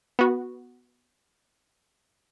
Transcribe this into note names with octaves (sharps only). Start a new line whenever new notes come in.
B3 F#4